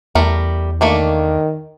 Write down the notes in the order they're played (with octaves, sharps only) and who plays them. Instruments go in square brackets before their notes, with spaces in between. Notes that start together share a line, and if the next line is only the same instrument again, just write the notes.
[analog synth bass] E2 [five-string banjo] G3 A3 A#4
[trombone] D#3 [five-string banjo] A3 A#3 D4